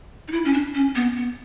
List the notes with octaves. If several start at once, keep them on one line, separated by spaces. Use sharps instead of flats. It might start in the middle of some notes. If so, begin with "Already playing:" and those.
D#4
E4
C#4
D4
C#4
B3
B3